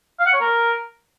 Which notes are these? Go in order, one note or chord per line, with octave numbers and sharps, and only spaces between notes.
F5
F#5
C#5
A#4